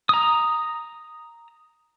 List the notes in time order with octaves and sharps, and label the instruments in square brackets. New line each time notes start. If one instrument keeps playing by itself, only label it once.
[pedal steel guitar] A#5 D#6